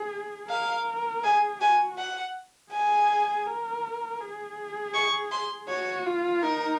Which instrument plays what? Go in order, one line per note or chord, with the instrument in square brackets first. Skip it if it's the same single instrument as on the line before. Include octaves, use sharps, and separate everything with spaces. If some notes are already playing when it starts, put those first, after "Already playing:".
Already playing: [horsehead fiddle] G#4
[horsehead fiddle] A#4 [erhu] F5
[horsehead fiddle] G#4 [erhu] G#5
[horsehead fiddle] F#4 [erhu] G#5
[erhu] F#5
[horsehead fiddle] G#4 [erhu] G#5
[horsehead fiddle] A#4
G#4
[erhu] C#6
C6
[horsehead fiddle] F#4 [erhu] C#5
[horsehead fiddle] F4
[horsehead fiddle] D#4 [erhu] A#4